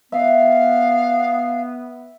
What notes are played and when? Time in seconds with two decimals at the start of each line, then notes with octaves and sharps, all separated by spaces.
0.12 B3 E5 F5